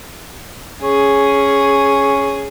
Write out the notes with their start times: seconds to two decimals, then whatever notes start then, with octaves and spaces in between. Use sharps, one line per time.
0.82 C#4 G#4